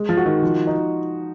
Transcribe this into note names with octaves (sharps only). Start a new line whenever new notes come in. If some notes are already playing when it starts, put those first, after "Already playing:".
Already playing: G#3
F3
F#4
D#3
F3
D#4